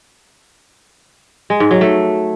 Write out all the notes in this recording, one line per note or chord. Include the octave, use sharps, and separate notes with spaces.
G#3
G#2
F#3
A3